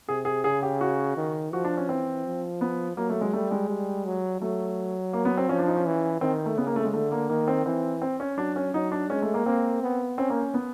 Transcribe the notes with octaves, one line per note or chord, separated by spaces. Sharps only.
C3 G#4
G#4
C#3 G#4
G4
F#4
D#3
F3 F#4
D4
C#4
E3 C4
F3
B3
F#3 A#3
A3
G#3
G3 A3
G#3
G3
F#3
F#3 A3
A#3
B3
C4
F3 C#4
D4
D#4
C#4
E3
D#3 C4
A3
C#3 B3
A#3
A3
G#3
D3 A3
A#3
D#3 A#3
C4
E3 C4
C4
C#4
F#3 D4
C#4
F#3 D#4
D4
G#3 C#4
A3
A#3
A#3 C4
B3
C4 C#4
A#3
B3